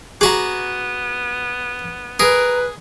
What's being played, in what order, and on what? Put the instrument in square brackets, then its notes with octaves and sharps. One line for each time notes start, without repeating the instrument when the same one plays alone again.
[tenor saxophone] B3 [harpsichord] F#4 D6 [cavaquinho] G#4 A#5
[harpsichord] G#4 [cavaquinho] A#4 [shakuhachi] B4